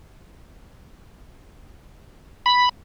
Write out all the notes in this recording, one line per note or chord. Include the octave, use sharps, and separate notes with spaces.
B5